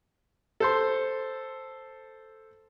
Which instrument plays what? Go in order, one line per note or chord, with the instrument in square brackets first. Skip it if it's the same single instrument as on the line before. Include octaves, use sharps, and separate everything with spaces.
[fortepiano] A4 C5 C6